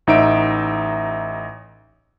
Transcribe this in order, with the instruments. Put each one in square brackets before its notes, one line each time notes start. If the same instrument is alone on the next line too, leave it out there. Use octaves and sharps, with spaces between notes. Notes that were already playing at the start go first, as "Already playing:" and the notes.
[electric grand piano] A1 D#4 E5 D7